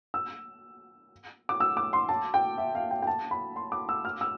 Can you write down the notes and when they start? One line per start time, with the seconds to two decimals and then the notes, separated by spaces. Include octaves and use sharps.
0.14 E6
1.49 D6
1.60 E6
1.77 D6
1.93 C6
2.09 A5
2.34 G5
2.58 E5
2.75 F5
2.91 G5
3.02 G5
3.07 A5
3.31 B5
3.56 C6
3.72 D6
3.89 E6
4.05 F6
4.21 E6